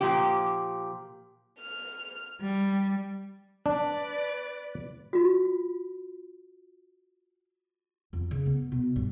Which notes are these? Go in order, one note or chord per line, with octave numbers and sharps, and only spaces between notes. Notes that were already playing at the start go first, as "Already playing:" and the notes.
A#2 F3 G4
F6
G3
D4 B4 D5
F4 F#4
F2
C#3
B3
B2
G2